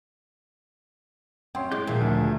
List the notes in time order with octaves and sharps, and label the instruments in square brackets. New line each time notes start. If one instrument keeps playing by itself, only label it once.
[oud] F#2 [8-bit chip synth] C4 C#4 C#5 [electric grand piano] G5 C6
[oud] G#3 [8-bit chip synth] E4 [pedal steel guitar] D6 G6
[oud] A#2 [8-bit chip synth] D#3 F4 E5 [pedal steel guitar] F3 G#4
[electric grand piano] D2